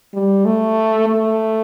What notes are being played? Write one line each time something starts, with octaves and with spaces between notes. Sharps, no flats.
G3
A3
A3